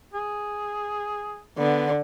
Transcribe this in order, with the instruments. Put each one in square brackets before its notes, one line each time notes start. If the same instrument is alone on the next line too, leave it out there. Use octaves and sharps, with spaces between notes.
[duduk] G#4
[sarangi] D3 [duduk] B3